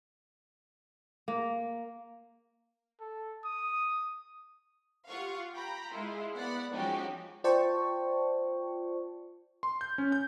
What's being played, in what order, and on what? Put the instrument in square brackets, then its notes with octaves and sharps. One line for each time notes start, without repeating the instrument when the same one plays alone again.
[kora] A#3
[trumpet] A4
D#6
[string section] F4 G4 F5 F#5 C#6
G5 A#5 B5
G#3 E4 F4
B3 D5 F#5 B5
F3 G#3 C#4 D#4 F#4 G4
[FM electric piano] F4 C5 D5 G5 A5 C#6
[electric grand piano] C6
G6
C#4
G6